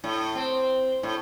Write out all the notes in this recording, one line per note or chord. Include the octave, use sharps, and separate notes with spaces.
A2
C4
A2